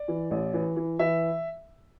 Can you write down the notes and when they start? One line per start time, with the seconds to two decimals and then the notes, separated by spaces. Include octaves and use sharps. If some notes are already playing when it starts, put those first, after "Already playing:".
Already playing: D5
0.08 E3
0.31 A1
0.54 E3
0.76 E3
0.99 E3 E5